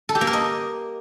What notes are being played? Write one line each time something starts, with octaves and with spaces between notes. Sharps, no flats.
A4
G4
A#3
A#4
D#5